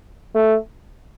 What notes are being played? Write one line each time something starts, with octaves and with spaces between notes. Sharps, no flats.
A3